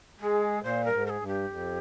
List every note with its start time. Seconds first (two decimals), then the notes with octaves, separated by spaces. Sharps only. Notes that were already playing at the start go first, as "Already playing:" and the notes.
0.19 G#3 G#4
0.63 A#2 C5
0.84 G2 A#4
0.91 G#2
1.06 A#4
1.09 G#4
1.20 G2
1.27 G4
1.49 F2